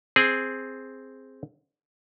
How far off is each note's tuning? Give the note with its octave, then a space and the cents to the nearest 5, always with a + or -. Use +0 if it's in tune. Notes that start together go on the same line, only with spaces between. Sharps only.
C4 +0 G#4 +0